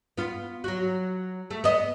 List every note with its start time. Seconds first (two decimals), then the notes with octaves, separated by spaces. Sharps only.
0.17 B3 F4
0.64 F#3 F#4
1.50 A3
1.64 B3 D#5